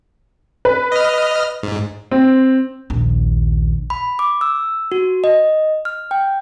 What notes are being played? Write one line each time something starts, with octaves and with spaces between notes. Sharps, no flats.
B4
D#5 F6
G#2
C4
A#1 D#2
B5
D6
E6
F#4
D#5
F6
G5